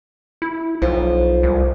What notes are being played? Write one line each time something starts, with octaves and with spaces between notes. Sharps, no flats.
E4
B1 F3
C2